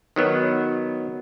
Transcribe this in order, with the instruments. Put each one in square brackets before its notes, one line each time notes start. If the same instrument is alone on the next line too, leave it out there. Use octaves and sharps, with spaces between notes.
[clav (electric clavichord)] D#3 F#3 B3